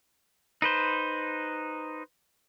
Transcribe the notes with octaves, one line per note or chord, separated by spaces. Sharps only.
D#4 B4 C5